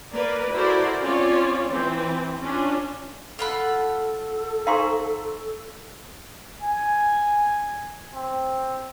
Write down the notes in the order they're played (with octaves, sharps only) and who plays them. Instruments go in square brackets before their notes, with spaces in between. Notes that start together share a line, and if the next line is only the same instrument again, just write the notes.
[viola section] A#3 A#4 B4 D5
E4 F#4 A4 A#4 C5 D5
C4 C#4 F4 C#5 D5
E3 C4
C#4 D4 F4
[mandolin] F4 F#5 B5 [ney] A4
[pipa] D#4 G#4 C5 [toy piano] F5 C6 C#6
[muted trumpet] G#5
C4